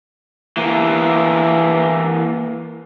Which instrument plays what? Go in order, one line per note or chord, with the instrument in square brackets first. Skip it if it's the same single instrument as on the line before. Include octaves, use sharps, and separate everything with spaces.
[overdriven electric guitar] E3 A#3